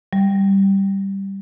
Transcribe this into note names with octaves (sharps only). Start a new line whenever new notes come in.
G3